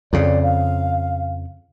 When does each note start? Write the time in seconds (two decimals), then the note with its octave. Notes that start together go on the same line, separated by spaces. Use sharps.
0.13 F2 C#3 D5
0.43 F5